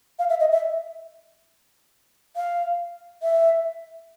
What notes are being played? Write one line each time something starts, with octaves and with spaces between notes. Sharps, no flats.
F5
E5
D#5
E5
F5
E5